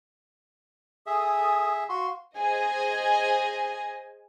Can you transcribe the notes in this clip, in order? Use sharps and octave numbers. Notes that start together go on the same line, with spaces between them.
G#4 A4 E5 G#5 D#6
F#4 F5 C6
G#4 C5 D#5 G#5